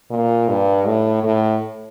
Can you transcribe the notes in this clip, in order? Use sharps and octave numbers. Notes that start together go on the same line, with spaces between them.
A#2
G2
A2
A2